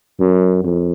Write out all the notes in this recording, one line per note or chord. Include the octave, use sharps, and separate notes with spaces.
F#2
F2